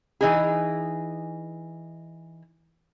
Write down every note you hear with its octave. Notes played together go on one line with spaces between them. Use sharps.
E3 D#4 G#4